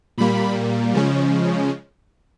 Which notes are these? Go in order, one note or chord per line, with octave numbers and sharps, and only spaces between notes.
A#2 G3 A#3 B5
C#3 F3 G#3 C#4